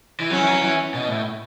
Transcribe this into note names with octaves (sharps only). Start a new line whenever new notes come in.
E3
F#3 C#4
E3
F#3
E3
B2
A2